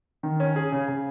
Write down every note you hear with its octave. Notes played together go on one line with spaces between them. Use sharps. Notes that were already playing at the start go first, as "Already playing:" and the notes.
D#3
C#4
G#4
C#3
C#3